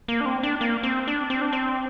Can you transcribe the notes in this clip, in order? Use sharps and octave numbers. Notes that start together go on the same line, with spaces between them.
A#3
D4
C4
D4
A#3
C4
D4
C4
D4
C4